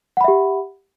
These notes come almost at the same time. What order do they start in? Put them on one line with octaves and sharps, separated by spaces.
F#5 B5 E5 G4